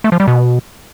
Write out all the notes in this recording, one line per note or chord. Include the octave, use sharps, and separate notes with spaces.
A3
F3
G3
B2